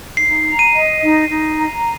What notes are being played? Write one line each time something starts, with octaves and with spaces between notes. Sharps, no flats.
D#4 C7
A#5
D#7
D#5
D#4
D#4
A#5